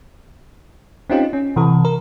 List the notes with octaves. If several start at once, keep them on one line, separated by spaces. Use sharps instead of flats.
C4 C#4 D#4 F4 G4
C#4
C3 E3 A4
A#4